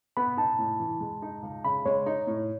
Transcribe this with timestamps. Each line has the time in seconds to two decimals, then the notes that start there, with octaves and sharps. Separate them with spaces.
0.17 B3 B5
0.37 D#4 A5
0.59 A2
0.80 E3
1.00 G#3
1.22 D#4
1.43 C#2
1.64 C#3 B5
1.86 G#3 C#5
2.06 D#4
2.27 A2